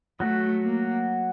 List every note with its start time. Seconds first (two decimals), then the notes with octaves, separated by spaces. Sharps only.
0.20 F#3 A3 F#4
0.63 A#3